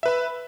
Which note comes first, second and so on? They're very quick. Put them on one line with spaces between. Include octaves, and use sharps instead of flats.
E5 B4 B5